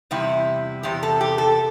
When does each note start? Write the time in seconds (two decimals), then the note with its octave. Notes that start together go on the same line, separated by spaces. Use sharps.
0.11 E2 C3 G3 E4
0.83 E2 C3 G4
1.03 A4
1.21 G4
1.38 A4